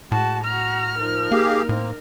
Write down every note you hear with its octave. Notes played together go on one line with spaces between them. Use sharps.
A2 G#3 F#4 A5
F#4 A#5 F6
F3 D#4 A#4
A#3 G4 G#4 F5
A2 A#3 C4